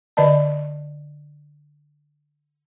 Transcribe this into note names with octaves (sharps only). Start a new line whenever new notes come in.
D3 D5 D#5 A5